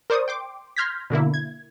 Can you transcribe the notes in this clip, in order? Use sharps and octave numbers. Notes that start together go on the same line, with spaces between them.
A#4 C5 D5 C#6 D#6
G5 C6 D6
C6 F6 G6 G#6 A#6 B6
B2 D3 A#3 E4
G#6